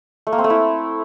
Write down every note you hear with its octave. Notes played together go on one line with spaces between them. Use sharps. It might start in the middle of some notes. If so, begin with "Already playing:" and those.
A3
A#3
C4
A3
E4